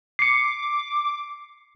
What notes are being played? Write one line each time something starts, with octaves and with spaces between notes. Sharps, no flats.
D6 C7 C#7